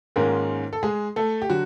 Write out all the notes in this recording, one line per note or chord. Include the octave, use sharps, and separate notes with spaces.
G#2 D#3 G#3 A#3 C#4 F4 A#4
A4
G#3 G#4
A3 A4
G4
D3 F#3 F#4